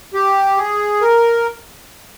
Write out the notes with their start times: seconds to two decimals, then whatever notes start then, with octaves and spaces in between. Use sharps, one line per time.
0.14 G4
0.57 G#4
1.01 A#4